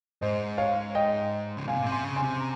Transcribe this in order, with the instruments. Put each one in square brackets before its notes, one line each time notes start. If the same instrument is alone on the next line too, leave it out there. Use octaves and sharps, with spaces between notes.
[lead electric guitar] G#2 [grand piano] C5 D#5
[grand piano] C#5 F5
D#5 G5
[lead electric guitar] C#3
[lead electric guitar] C3 [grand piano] F5 G#5
[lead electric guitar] A#2
C3
[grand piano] G#5 C6
[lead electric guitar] C#3
[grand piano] G#5 C6
[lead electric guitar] C3
[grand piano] A#5